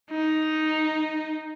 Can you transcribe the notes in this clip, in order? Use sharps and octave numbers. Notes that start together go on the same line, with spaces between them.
D#4